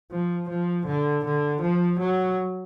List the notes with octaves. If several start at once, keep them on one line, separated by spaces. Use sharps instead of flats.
F3
F3
D3
D3
F3
F#3